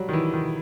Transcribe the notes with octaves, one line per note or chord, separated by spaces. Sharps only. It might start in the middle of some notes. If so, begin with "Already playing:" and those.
Already playing: F#3 G3
D#3
E3
D#3